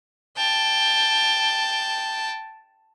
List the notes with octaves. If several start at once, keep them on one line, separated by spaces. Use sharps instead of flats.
G5 A5